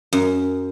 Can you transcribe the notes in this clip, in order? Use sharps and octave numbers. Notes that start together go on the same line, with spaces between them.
F#2